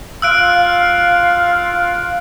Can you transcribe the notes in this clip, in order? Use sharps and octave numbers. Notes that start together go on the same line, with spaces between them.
F4 F5 E6 F#6 D7